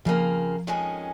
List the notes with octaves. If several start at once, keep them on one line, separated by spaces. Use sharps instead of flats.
F2 C#3 F3 A#3 F4
F2 D#3 G#3 C#4 G#4